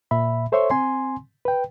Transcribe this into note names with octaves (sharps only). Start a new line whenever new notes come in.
A#2 E5 B5
A4 C5 C#5 E5 C6 C#6
C4 G#5 C6
B4 G5